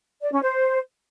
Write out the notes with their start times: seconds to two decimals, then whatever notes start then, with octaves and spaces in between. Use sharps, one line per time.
0.22 D5
0.32 C#4
0.42 C5